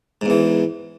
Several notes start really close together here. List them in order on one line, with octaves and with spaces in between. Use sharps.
G#2 E2 E3